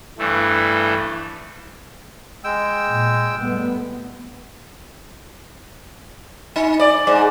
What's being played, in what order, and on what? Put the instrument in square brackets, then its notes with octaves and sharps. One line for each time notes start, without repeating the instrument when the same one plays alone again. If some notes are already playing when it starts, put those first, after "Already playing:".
[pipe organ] G2 E3 A3
[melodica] G#3 G5 E6
[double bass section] A#2
G3 A3 B3
[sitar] D#4
D5
G#2